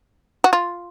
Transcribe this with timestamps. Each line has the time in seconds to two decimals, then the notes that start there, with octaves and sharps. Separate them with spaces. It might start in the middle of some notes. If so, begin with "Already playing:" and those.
0.44 F#4
0.53 F4